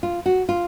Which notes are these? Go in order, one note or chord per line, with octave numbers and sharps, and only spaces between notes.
F4
F#4
F4